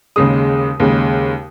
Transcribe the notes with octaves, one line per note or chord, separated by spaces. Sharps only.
D#2 C#3 G#3 D#6
D#2 C#3 G#3